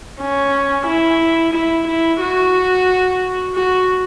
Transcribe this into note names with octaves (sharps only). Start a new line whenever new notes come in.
C#4
E4
E4
E4
F#4
F#4